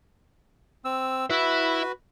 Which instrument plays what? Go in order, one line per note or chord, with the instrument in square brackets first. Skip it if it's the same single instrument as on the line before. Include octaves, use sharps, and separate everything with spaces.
[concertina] C4 E6
[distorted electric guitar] E4 E5 [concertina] F#4 B4